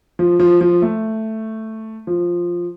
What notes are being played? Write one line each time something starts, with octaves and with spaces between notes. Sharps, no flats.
F3
F3
F3
A3
F3